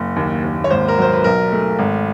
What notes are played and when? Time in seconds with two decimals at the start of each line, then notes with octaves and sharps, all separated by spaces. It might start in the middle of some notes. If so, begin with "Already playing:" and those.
Already playing: F#1
0.16 D#2
0.43 D#2
0.64 C#5
0.70 G#1 C5
0.88 A#4
0.98 F#3 C5
1.13 B4
1.24 B1 A#4
1.52 A3
1.79 G#1